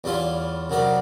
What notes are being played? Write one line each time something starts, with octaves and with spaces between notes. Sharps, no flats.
E2 G3 C#4 E4 F4 C6
C2 C#3 F#3 A#4 D5